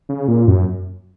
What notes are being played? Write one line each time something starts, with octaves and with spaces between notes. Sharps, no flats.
C#3
A#2
F#2